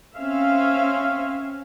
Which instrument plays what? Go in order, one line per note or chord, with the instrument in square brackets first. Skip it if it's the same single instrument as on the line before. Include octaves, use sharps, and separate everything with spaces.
[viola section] C4 C#4 E5 F5